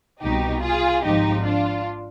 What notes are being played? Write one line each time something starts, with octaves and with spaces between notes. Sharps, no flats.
C2 B2 D#4 G4
F4 G#4
G#1 G#2 F3 D#4 G4
D4 F4